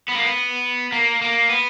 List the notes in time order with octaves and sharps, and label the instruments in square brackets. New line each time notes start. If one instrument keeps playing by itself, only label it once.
[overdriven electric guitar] B3
A#3
B3
A#3
A#3
B3